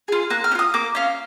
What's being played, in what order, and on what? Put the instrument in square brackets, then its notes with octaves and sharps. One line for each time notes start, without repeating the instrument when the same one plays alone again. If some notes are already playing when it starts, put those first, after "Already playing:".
[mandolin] F4 G#4
A#3 F#6
F6
C#4
F4 D#6
A#3 D6
C#4 F4